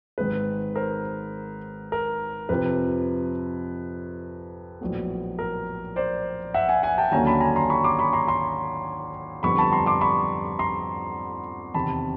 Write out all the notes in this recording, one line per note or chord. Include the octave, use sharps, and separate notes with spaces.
G#1 G#2 D#3 G#3 B4
A#4 C5
A#4
F2 C3 F3 B4
A#1 A2 F#3 B3
A#4
C5 D5
E5 F#5
F#5 G#5
F#5 G#5
G5 A5
D#2 D3 F#3 A#3 C#4 G#5 A#5
A5 B5
G#5 A#5
A#5 C6
B5 C#6
C6 D6
B5 C#6
A#5 C6
A#5 C6
F2 D3 G3 B3 B5 C#6
A5 B5
A#5 C6
C6 D6
B5 C#6
A#5 C6
E2 C3 D#3 A5 B5